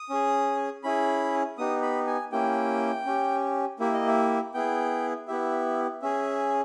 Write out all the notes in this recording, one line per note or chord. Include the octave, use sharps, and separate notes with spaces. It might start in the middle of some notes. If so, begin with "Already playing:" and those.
Already playing: D#6
C#4 G#4
C#4 E4 G#4 B5
B3 D#4 G4 D#6
B5
G#5
A#3 C#4 E4 G4 G5
C#4 G4
A#3 E4 G4 E5
D#5
E5
B3 E4 G#4 G5
B3 E4 G4 E5
C#4 G#4 E5